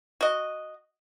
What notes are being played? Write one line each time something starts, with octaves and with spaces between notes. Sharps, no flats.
F#4 D#5